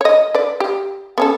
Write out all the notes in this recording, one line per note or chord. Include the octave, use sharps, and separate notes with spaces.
C#5 D#5
B4 D5
G4
B3 C#4 A4